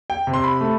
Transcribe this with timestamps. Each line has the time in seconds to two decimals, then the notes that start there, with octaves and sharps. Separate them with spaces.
0.10 G5
0.27 C3
0.34 C6
0.44 B5
0.61 A3